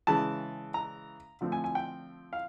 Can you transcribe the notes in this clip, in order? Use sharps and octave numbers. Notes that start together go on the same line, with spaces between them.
C#3 E3 G#3 A5
A#5
D3 F3 A3 C4
G#5
G#5
G5
F5